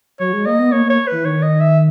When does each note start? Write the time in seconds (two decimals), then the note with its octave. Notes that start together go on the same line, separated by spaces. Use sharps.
0.19 F#3 C#5
0.33 G#3
0.46 A#3 D#5
0.59 B3
0.72 A#3 C#5
0.86 A#3 C#5
1.07 E3 B4
1.25 D#3 C#5
1.43 D#5
1.61 E5